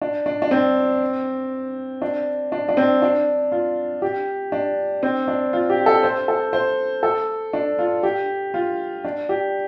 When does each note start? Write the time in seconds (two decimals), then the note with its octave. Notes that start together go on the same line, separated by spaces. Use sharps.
0.02 D4
0.26 D4
0.42 D4
0.51 C4
2.02 D4
2.52 D4
2.69 D4
2.77 C4
3.02 D4
3.52 F4
4.02 G4
4.52 D4
5.03 C4
5.28 D4
5.53 F4
5.69 G4
5.86 A4
6.03 C5
6.28 A4
6.53 C5
7.03 A4
7.53 D4
7.79 F4
8.03 G4
8.54 F4
9.05 D4
9.29 G4